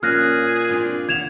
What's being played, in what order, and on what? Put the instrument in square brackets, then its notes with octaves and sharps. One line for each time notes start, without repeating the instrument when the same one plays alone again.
[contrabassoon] A#2 [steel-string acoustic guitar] C#3 F4 [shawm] G#4 [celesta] F6 F#6 A#6
[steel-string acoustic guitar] C4 D4 F4
[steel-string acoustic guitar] E2 A#3 F#5 [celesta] G#6 E7 F7